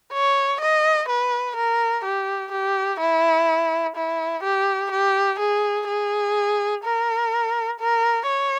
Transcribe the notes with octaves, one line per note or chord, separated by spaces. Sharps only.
C#5
D#5
B4
A#4
G4
G4
E4
E4
G4
G4
G#4
G#4
A#4
A#4
C#5